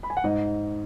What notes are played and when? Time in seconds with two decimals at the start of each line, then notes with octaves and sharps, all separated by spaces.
0.03 B5
0.10 G#5
0.17 F#5
0.24 G#2 D#5